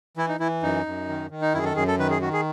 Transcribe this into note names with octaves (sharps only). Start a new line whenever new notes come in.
E3 E4
D#4
E3 E4
F#2 D#4
F#2
D#3
D#3
D#4
F#2 E4 G#4
A4
F#2 G#4
A4
D#3 B4
G#4
D#3 F#4
G#4